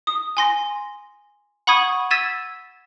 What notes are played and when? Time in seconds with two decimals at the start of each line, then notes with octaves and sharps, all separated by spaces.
0.07 D#6
0.37 G#5 C6 A#6
1.67 F#5 B5 C#6 D#6 G#6 D#7
2.11 E6 G#6 A6 B6 D#7 E7